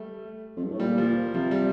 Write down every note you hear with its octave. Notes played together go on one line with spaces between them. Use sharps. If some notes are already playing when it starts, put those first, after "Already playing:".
Already playing: G3 A3
F2
G2
A2
A#2 G3
F3
C3 F3
G3